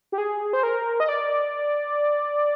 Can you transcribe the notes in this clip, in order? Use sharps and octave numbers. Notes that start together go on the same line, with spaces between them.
G4
G#4
C5
A#4
D#5
D5